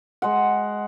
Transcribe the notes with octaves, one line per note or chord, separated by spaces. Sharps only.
G#3 F#5